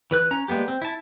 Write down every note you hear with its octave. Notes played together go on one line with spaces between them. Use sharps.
E3 B4 F#6
C#4 A#5
G3 G#3 A#3 B3 G4
C4
E4 A5